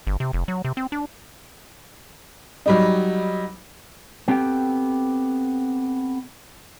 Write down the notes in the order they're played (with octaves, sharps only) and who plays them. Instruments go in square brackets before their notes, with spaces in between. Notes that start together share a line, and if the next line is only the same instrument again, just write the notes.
[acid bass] G1
C3
F1
F#3
C3
C4
D4
[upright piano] F#3 G3 D#4
[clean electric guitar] B3 C4 G4 A4 G5